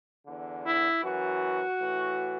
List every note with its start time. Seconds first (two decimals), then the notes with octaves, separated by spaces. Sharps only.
0.25 E2 D3
0.65 E4
1.02 F#2 E3 F#4
1.79 A2 E3